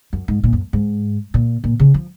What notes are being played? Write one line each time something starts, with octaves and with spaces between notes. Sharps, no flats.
F#2
G#2
A#2
F#2
G#2
A#2
A#2
C#3
F3